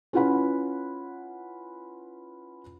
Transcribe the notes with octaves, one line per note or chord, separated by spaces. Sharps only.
C#4 E4 F4 B4 F#5 B5